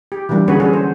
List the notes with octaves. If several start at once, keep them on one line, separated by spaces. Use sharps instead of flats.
G4
E3 F#3 G3 A#3 D4
D3 C#4 F#4 G#4 B4 C#5
C#4 D4 F#4 G#4 A4
C5